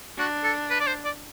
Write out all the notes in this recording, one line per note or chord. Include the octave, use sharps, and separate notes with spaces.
D4 F#4
A4
B4
D5
C5
D5